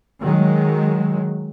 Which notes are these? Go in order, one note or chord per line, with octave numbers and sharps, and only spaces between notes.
D#3 F#3 G#3